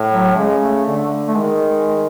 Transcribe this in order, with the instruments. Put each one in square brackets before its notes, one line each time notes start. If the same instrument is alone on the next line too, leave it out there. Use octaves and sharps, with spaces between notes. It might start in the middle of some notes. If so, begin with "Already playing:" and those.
Already playing: [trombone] A2
[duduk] F#3
[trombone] C#3 [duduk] G#3
[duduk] A3
[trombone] D3
[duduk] A3
[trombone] D#3 [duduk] G#3